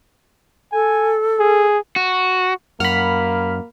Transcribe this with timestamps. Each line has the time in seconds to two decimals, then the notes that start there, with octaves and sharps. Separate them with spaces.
0.73 A4 G#5
1.40 G#4
1.96 F#4
2.80 F#2 A#3 F#5 B5 F6